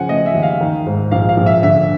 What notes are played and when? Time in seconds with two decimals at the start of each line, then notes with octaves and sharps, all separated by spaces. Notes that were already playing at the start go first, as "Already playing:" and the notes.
Already playing: C#3 F3 F#5 G#5
0.09 A3 D#5
0.26 E5
0.35 D#2
0.43 F5
0.60 D#3
0.87 G#2
1.11 A#1 F5
1.29 F5
1.37 A#1
1.46 E5
1.63 D3 E5